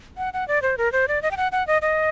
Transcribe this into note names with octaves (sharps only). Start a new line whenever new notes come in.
F#5
F#5
D5
C5
A#4
C5
D5
D#5
G5
F#5
F#5
D#5
D#5